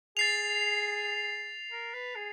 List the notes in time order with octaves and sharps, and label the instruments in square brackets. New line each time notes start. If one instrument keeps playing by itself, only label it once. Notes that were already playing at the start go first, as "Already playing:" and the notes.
[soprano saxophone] G#4 [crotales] A6 C7 F7
[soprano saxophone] A#4
B4
G#4